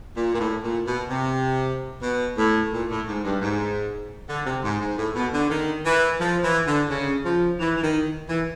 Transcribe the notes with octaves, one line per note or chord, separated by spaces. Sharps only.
A#2
A#2
A2
A#2
B2
C3
B2
A2
A#2
A2
G#2
G2
G#2
D3
C3
G#2
G#2
A2
B2
D3
D#3
E3
F3
E3
D3
C#3
F3
E3
E3
D#3
E3